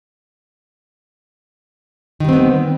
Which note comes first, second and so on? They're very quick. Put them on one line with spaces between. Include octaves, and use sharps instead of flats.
D#3 G3 C4 B3